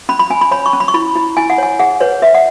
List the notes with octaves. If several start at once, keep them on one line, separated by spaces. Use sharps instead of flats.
C#4 B5
B5
C#4 G#5
B5
C#5 B5
C#6
C#4
B5
C#6
E4 B5
E4
E4 G#5
F#5
C#5 G#5
G#4 F#5
B4 C#5
B4 E5
F#5